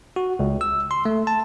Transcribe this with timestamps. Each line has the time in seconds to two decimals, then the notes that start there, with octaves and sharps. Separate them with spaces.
0.16 F#4
0.39 C#2
0.61 E6
0.91 C6
1.05 A3
1.27 A5